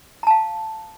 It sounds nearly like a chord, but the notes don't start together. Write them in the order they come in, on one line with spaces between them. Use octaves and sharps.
A#5 A5 F5